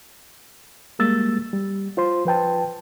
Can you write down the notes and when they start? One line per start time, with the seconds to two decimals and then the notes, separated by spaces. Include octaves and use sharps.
0.99 G3 G#3 A#3 E6 A6
1.53 G3
1.97 F4 C5 C6
2.25 F3 B4 G5 A5